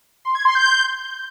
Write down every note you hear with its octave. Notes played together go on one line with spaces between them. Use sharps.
C6
G#6
C6
G6